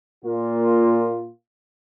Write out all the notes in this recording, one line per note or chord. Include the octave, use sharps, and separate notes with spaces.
A#2 A#3 F4